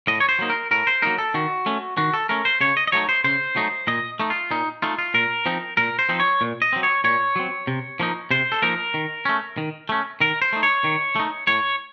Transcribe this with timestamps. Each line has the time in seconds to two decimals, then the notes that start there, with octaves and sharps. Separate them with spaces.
0.07 A2 D#5
0.20 C#5
0.29 C5
0.39 F#3 A#3 D#4
0.50 A#4
0.71 A2 A#4
0.87 C5
1.02 F#3 A#3 D#4 A#4
1.18 A4
1.34 D#3 F#4
1.66 A3 C#4
1.97 D#3 F#4
2.13 A4
2.29 A3 C#4 A#4
2.45 C5
2.61 C#3 C#5
2.77 D#5
2.87 D#5
2.92 F#3 A3 D#4 C#5
3.09 C5
3.24 C#3 C5
3.56 F#3 A3 D#4
3.87 A#2 D#5
4.20 A3 D#4
4.30 F4
4.51 A#2 D#4
4.82 A3 D#4 F4
4.99 F4
5.14 A#2 A#4
5.46 F3 C4 D#4
5.77 A#2 A#4
5.99 C5
6.09 F3 C4 D#4
6.20 C#5
6.41 A#2
6.62 D#5
6.73 F#3 C4
6.83 C#5
7.04 A#2 C#5
7.36 F#3 C4
7.67 C3
8.00 F3 A#3 D#4
8.31 C3 C5
8.52 A4
8.62 F3 A#3 D#4 A#4
8.94 D#3
9.25 A3 C#4
9.58 D#3
9.89 A3 C#4
10.21 D#3 A#4
10.42 C5
10.53 A3 D#4
10.63 C#5
10.84 D#3
11.16 A3 D#4
11.47 A2 C#5